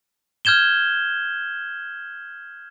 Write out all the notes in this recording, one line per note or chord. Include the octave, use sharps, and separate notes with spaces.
F6 G6 G#6 E7 G7